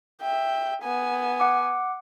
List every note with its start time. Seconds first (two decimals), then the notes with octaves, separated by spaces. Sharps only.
0.21 E5 G5
0.83 B3 G#5
1.40 F#5 D6